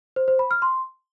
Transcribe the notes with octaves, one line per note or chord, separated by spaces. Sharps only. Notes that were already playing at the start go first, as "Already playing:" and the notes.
C5
C5
B5
F6
C6